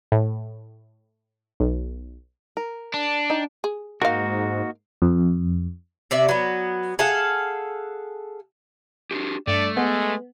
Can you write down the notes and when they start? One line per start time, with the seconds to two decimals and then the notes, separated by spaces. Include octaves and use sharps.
0.12 A2
1.60 B1
2.57 A#4
2.94 D4
3.30 D#4 G5
3.64 G#4
4.02 G#2 A#3 D#4 F#4 A#4 F5
5.02 F2
6.11 C3 D5 E5
6.29 F#3 B3
6.99 G#4 A4 F5 F#5
9.11 D4 F#4 G4
9.47 G2 A3 D5
9.77 G#3 B3